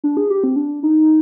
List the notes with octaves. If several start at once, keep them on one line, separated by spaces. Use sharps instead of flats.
D4
G#4
G4
C4
D4
D#4